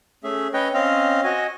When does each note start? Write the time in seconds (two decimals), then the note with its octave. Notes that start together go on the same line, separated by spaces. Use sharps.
0.24 A3 C#4 G#4 E5
0.54 C#4 B4 C#5 D#5 G5
0.74 C4 C#4 D#5 F5
1.24 F#4 D#5 G#5